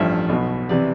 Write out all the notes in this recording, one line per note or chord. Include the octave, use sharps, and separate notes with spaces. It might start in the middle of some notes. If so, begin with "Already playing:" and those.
Already playing: A1 G2 F3 E5
B1 B2
C3 E3 D5